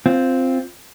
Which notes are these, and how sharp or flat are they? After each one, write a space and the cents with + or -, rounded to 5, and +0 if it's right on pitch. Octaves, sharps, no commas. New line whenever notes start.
C4 +0 F4 +0